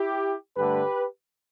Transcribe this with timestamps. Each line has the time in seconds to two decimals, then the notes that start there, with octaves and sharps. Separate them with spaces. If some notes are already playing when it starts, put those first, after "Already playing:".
Already playing: E4 G4
0.56 G2 D3 A3 G4 B4